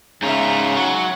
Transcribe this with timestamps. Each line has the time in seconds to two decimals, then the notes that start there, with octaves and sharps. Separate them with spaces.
0.22 G#2 C#3 F4 E5 A#5
0.76 F#3 F#5